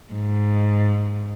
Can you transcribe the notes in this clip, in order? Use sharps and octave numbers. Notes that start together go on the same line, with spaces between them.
G#2